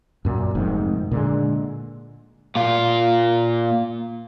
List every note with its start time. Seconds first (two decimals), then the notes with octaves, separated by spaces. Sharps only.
0.25 F#2 A#2
0.55 F1 G#2 D#3 C4
1.11 A#2 D3 G#3
2.55 A#2 F4